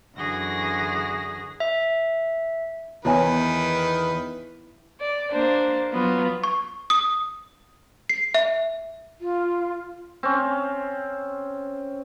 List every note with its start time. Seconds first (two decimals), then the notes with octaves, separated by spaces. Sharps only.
0.17 F#2 D3 E3 F#4 G#4 A#6
1.60 E5
3.05 E2 D#3 E4 B4 C#5 G#5
4.99 D5
5.30 A#3 D4 C5
5.92 F#3 B3 F4 B4
6.44 C#6
6.90 D#6
8.09 C7
8.34 E5
9.20 F4
10.23 C4 C#4